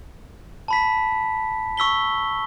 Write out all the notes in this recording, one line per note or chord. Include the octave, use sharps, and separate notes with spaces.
A5 B5 B6
C#6 E6 B6 G7